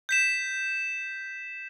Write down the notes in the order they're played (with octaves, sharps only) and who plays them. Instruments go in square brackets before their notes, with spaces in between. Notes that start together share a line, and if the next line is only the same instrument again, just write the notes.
[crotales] G6 B6 E7